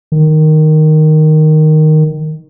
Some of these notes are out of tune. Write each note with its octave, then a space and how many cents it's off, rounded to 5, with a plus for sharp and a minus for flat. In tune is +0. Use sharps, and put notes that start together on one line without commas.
D#3 -5